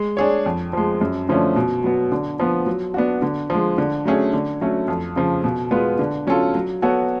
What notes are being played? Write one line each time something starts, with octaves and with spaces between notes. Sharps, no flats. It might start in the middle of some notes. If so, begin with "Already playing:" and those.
Already playing: G#3
D4 G#4 C#5
F2
F3 G#3
F#2
D3 F3 A3 C#4
B2
F#3 B3
D3
F3 B3
F#3
B3 D4 F#4
D3
F3 G#3
D3
F#3 A3 C#4 G#4
D3
F#3 A3 C#4
F2
C#3 F3
B2
G#3 B3 F4 B4
D3
F#3 C#4 F4 A4
F#3
B3 F#4 A4 C#5